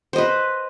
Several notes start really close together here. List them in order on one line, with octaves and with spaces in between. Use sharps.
C5 D#5 B4